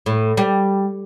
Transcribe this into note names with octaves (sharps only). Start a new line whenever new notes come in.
A2
G3